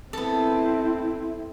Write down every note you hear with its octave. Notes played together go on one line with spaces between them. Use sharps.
B3 C4 E4 A4